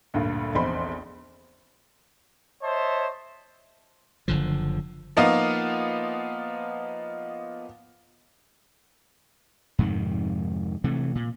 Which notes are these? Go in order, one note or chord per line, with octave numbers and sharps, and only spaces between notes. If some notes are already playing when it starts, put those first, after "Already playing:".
D2 G2 A#2
F1 A#1 E2 C4 B5 C6
C5 C#5 D#5 E5 A5
F#1 D3 F3
F3 A#3 B3 D#4 F4
F2 G#2 C3 D#3
C3 E3 A3
A#2